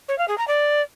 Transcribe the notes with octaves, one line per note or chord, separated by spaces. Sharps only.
C#5
F5
G#4
A#5
D5